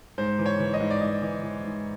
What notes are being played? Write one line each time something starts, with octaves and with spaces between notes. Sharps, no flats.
G#2 C5
E3
C#5
E3
D#5
G#2
D5
G#2 D#5
E3
E3
G#2